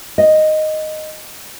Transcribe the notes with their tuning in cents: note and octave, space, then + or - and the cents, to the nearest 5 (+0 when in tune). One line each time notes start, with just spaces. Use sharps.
D#5 -5